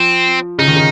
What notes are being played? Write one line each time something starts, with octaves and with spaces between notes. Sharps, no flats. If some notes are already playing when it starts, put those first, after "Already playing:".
Already playing: F3 C4
C#3 D#4
D#3
C#3